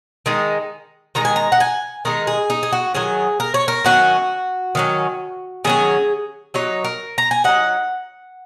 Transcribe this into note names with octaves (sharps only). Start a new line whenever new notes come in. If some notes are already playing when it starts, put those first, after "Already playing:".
D#3 G#3 D#4
D#3 G#3 D#4 A#5
G#5
A#5
F#5
G#5
D#3 G#3 D#4 A#4
G#4
D#4
G#4
F#4
D#3 F#3 C#4 G#4
A#4
C#5
A#4
D#3 F#3 C#4 F#4
D#3 F#3 C#4
D#3 F#3 C#4 G#4
F#3 D#4 C#5
A#4
A#5
G#5
F#3 D#4 F#5